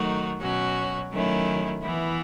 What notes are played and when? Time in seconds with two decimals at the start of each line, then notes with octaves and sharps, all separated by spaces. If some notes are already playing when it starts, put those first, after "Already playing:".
Already playing: D#3 F#3 A3 D#4 F#4
0.41 B2 F#3 C#4 F#4
1.12 D#3 F#3 A3 C#4 E4
1.83 E3 B3 E4